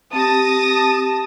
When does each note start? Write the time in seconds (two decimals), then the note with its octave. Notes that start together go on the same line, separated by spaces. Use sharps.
0.13 C4 G4 A5 D#6 A#6